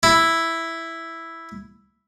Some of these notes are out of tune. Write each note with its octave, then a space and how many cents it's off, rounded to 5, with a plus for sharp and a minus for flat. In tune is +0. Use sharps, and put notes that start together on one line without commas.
E4 +0